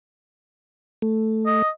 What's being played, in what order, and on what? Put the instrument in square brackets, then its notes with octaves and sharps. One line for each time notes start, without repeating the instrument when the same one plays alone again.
[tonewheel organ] A3
[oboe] D#5